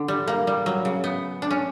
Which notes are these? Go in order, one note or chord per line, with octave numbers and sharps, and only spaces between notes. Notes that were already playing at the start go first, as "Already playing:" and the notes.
Already playing: D3
G3
A#3
G3
F#3
C#3
B3
D4
C#4